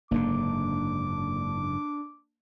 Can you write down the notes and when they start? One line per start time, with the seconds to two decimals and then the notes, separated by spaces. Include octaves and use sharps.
0.11 F#1 G#2 D3 A#3 D4 D6